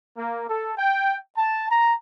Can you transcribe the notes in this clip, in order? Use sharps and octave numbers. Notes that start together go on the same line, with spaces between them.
A#3
A4
G5
A5
A#5